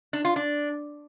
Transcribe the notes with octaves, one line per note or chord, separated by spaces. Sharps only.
D4
F4
D4